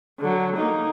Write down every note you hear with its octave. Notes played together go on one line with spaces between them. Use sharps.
D3 F#3
A#3 D#4